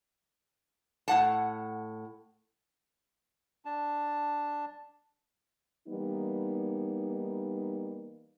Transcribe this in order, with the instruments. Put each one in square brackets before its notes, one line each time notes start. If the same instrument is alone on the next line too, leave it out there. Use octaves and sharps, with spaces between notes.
[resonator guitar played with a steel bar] A2 F#5 A5
[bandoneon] D4 A5
[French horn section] E3 G3 A#3 B3 D#4